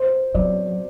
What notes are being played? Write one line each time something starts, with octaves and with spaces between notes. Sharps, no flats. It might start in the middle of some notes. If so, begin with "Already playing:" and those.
Already playing: C5
F#3 D5